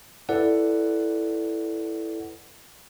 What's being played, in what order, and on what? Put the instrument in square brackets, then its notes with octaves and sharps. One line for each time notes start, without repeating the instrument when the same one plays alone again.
[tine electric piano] E4 A4 B4 D5 F#5